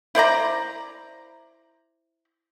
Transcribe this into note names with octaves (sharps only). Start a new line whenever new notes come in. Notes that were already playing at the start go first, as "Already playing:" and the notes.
E4 C5 D5 A#5